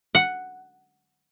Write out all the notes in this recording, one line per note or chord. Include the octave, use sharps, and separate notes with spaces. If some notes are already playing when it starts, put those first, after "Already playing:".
F#5